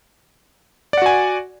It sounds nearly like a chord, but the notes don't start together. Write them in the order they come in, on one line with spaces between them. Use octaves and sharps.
D5 F#5 F#4 G#5